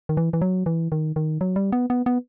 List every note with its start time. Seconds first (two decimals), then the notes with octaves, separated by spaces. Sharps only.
0.09 D#3
0.17 E3
0.33 E3
0.41 F#3
0.66 E3
0.92 D#3
1.16 D#3
1.41 F#3
1.56 G3
1.72 B3
1.90 B3
2.06 B3